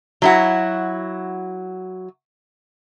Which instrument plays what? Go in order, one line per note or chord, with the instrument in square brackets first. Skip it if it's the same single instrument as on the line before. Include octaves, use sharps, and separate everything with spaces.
[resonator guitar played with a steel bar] F#3 E4 F#4